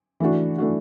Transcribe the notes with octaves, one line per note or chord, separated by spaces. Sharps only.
E3 A3 D4 F#4
E3 A3 D4 F#4